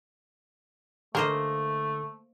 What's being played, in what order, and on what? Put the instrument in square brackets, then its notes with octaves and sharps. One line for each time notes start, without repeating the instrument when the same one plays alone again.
[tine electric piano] D3 A4 [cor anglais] A3 [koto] A#3 C5 D#5 [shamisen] A#4